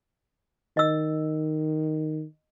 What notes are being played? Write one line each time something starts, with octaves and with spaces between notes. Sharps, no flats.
D#3 D#5 E6